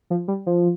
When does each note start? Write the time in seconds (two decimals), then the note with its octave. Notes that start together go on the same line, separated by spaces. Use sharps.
0.10 F3
0.28 G3
0.46 F3